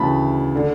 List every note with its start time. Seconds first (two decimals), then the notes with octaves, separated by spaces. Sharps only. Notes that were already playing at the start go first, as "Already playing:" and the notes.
Already playing: D2 C#3 E3 A5 B5
0.56 D3